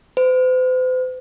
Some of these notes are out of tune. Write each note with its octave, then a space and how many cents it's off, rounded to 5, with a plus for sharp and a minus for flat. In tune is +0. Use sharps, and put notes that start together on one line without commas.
C5 -45